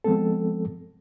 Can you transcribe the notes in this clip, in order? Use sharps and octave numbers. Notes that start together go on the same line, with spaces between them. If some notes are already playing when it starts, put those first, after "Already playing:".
F3 G#3 B3 C4 A4